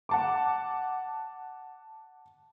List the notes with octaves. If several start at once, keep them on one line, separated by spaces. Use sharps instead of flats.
F#5 A5 D6